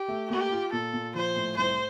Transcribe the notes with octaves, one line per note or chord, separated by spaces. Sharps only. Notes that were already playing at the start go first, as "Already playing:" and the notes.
Already playing: G4
A3
A#3 G4
F4
A#2 A4
A#2
F3 C5
A2
C2 C5